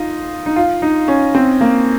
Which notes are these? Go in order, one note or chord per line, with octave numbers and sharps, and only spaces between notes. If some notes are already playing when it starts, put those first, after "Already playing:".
Already playing: D#4 F4
D#4
F4
D#4
C#4
C4
A#3